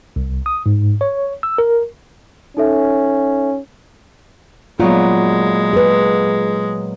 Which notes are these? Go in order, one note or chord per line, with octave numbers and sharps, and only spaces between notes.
C2
D#6
G#2
C#5
E6
A#4
C#4 D#4 A4 E5
A#2 F#3 G#3 B3 F4
G#4 B4